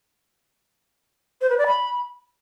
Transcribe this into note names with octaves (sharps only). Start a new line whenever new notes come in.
C5
B4
D5
B5